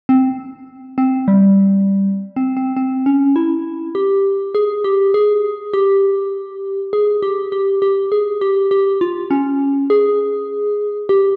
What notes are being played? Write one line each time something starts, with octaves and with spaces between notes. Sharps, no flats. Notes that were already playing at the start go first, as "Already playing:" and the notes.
C4
C4
G3
C4
C4
C4
C#4
E4
G4
G#4
G4
G#4
G4
G#4
G4
G4
G4
G#4
G4
G4
F4
C#4
G#4
G4